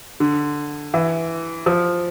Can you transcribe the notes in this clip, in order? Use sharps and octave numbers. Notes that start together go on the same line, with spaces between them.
D3
E3
F3